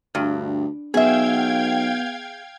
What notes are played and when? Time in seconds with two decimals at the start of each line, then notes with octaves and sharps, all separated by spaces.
0.15 D2 G2
0.94 B1 B3 G#4 E5 F5 G5 G#6